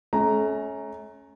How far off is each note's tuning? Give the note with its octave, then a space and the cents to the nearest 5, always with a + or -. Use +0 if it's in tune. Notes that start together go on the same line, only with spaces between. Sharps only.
A3 -40 C#4 +0 A#5 +0